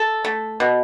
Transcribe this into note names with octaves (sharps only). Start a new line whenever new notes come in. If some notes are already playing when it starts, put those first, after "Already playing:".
Already playing: A4
A3
B2